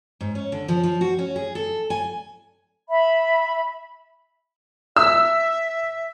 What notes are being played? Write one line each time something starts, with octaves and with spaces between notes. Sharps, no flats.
G#2
C#4
D3
F3
F3
F#4
C#4
G#4
A4
G#5
E5 B5
E5 E6